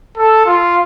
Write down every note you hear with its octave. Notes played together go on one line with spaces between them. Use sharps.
A4
F4